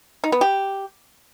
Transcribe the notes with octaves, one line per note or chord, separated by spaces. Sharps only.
D#4
B3
G4